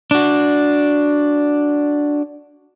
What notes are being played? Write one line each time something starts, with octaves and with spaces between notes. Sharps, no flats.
D4 F#4